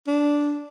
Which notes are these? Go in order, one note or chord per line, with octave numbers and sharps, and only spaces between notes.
D4